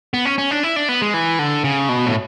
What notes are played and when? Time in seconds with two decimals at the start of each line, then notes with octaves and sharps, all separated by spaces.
0.14 B3
0.25 C#4
0.38 C#4
0.51 D4
0.63 E4
0.76 D4
0.89 B3
1.02 G#3
1.14 E3
1.39 D3
1.64 C#3
1.89 B2
2.06 A2